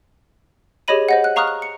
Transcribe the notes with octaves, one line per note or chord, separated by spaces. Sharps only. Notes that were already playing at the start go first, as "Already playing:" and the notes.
G4 G#4 C#5 D#5 B5 D#7
C5 D#5 F#5
F#6
F5 A#5 C#6 D#6 F6 F#6
F#6
C#7